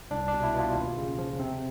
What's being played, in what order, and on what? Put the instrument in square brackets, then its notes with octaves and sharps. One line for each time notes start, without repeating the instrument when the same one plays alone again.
[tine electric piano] C2 D4
D4
B2
E4
B2
F4
D#2
C#3
F3
C3 C4